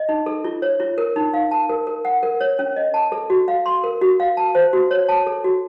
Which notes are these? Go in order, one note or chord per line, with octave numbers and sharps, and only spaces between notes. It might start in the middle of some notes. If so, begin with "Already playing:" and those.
Already playing: D#5
D#4
A4
F4
C#5
F4
A#4
D#4
F5
A5
A#4
A#4
F#5
A#4
C#5
C#4
D#5
A5
A4
F#4
F5
C6
A#4
F#4
F5
A5
C5
F#4
C#5
A5
A4
F#4